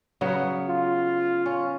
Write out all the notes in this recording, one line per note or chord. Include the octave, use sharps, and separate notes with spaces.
C#3 F#3 B3
F4
C#4